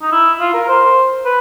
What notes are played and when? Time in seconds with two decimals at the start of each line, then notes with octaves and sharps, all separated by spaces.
0.02 D#4
0.12 E4
0.40 F4
0.54 A#4
0.68 C5
1.25 B4